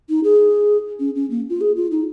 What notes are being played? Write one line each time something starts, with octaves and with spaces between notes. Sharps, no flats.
D#4
G#4
C#4
C#4
A#3
F4
G#4
F4
D#4